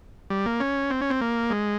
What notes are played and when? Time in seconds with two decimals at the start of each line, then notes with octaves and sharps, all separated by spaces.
0.30 G3
0.46 A#3
0.60 C#4
0.90 C4
1.01 C#4
1.10 C4
1.21 A#3
1.50 G#3